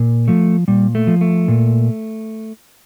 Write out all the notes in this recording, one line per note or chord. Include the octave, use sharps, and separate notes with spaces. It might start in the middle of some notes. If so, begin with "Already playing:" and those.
Already playing: A#2
F3 A3
A#2 G3
A3
F3
A3
A#2